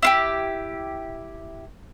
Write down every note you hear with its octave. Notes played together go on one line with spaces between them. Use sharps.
E4 F4 G4